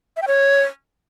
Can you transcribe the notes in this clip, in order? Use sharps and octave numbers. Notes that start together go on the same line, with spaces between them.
E5
G5
C#5